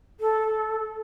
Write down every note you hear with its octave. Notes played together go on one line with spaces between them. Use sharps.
A4